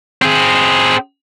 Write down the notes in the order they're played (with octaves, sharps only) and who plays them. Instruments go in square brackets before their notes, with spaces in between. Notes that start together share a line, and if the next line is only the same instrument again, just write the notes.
[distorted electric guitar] C4 G#4